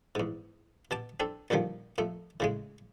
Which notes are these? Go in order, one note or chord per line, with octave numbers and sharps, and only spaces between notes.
E2 G#2
B2 A5 D6
C4 D4 A4
A#1 G2 D3 D#3 F3
F2 A3
A2 C#3 G#3